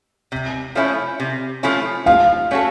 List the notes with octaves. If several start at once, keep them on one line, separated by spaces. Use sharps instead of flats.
C3
F3 A3 C#4 E4
C3
F3 A3 C#4 E4
F3 F5
A3 C#4 F#4 A4